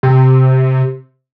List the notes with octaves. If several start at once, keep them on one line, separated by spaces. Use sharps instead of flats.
C3